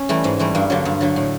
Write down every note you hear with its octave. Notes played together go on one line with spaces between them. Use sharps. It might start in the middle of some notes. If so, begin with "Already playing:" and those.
Already playing: C#4
E3 G3 A3
G#2 G#3
E3 G3 A3
G2 A#3
D3 F#3 A#3
G2
D3 F#3
A2